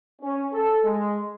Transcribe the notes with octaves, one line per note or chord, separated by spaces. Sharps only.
C#4
A4
G#3